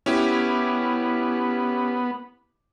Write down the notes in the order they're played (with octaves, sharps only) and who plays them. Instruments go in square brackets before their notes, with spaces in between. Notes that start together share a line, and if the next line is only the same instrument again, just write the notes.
[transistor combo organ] B3 [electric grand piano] C#4 E4 G4